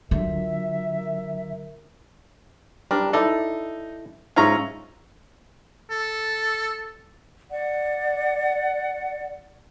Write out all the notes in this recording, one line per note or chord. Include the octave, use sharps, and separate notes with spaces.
D3 F#3 F4 A#4 E5
G3 D4 A#4
D#4 E4 A4 D5
G#2 C#4 F4 E5 F5 A#5
A4
D5 F#5